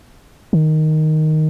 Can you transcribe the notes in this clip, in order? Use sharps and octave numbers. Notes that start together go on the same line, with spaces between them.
D#3